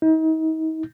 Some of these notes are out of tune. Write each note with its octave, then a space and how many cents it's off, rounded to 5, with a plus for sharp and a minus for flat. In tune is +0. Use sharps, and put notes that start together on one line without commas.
D#4 +40